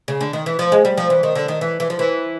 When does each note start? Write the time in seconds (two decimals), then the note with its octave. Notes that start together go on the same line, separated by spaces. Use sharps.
0.08 C#3
0.21 D3
0.33 D#3
0.46 E3
0.59 F3
0.72 G#3
0.85 G3
0.97 F3
1.10 E3
1.23 D#3
1.35 D3
1.48 D#3
1.61 E3
1.80 E3
1.90 F3
1.99 E3